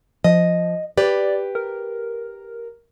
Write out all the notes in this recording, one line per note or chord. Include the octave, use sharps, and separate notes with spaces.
F3 D#5
G4 B4 D5
A#4